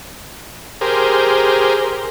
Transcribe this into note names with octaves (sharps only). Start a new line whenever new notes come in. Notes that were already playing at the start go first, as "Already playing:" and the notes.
G4 G#4 A#4 C5